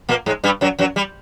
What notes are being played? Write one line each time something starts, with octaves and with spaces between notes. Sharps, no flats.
A#2 A#3
G#2 G#3
G2 G3
F#2 F#3
F#2 F#3
G3